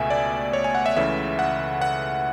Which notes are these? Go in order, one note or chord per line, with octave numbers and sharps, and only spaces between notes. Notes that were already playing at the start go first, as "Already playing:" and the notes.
Already playing: C#2 B2 A3 E5 G#5
D5
C#5
G#5
F#5
E5
C#2 C#3 E3 A3 E5
F#5
F#5